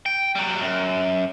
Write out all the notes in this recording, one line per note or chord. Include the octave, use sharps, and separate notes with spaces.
G5
F#3 G3
F#2